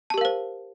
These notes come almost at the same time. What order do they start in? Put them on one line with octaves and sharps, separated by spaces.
A5 G4 A#4 F5 C5